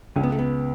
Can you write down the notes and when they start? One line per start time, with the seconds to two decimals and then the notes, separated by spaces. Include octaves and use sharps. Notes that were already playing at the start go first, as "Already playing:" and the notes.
0.16 C#2 C#4
0.23 B3
0.32 A3
0.39 B3